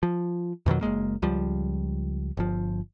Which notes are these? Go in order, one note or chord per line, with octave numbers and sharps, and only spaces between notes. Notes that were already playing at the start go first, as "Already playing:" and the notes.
F3
F2 B2 D#3 F#3
F#1 D#2 G#3 A#3
C#2 F3 G3
G1 F3